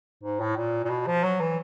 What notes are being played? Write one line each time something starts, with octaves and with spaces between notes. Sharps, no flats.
G#2
A2
A#2
A#2
B2
F3
F#3
E3